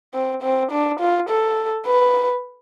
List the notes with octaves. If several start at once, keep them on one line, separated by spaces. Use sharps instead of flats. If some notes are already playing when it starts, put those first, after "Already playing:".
C4
C4
D4
F4
A4
B4